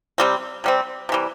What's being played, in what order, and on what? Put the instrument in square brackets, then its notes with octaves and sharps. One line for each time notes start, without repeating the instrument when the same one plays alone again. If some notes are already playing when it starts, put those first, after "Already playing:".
[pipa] C3 G3 C4
C3 G3 C4
C3 E3 G3